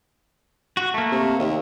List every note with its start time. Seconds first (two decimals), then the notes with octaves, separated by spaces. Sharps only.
0.77 F#4
0.94 A3 A#3
1.12 C3
1.40 D#2